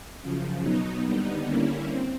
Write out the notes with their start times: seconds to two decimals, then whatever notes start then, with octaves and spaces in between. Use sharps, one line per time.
0.21 F#2 C#3 F3
0.62 B2 F#3 B3 D#4
1.05 D#2 D3 G3 B3 D#4
1.46 D3 G3 A#3 C#4 E4
1.87 C4